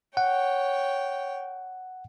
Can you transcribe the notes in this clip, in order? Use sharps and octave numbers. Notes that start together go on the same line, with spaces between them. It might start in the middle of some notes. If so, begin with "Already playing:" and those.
C#5 F#5 G5